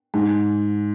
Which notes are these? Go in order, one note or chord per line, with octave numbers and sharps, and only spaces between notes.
G#2